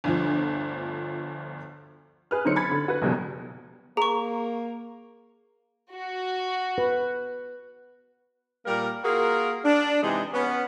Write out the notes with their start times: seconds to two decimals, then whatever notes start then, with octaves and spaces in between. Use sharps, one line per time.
0.04 G1 D2 F3
2.31 G#4 B4 F6
2.45 D3 F#3 C4 D#4 C5 C#7
2.56 B5 G#6 A6
2.71 D3
2.88 F#4 B4
3.02 F#1 F2 B2 G3
3.97 A#3 G#4 A#5 C#6
5.91 F#4
6.78 B4
8.66 A#2 G3 A#3 A#4
9.05 A#3 F4 F#4 G#4 A#4
9.65 D4
10.03 C3 E3 G#3 D#4 G#4
10.33 B3 C#4